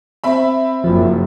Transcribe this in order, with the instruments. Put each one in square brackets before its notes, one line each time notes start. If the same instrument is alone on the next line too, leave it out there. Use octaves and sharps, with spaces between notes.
[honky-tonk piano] C4 E5 B5
[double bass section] F#1 F#2 [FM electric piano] F3